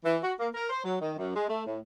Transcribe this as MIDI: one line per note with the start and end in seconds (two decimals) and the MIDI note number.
0.05 0.18 52
0.23 0.33 66
0.39 0.49 58
0.55 0.68 70
0.69 0.80 72
0.84 0.96 54
1.01 1.12 51
1.17 1.35 42
1.36 1.48 56
1.49 1.66 57
1.66 1.79 45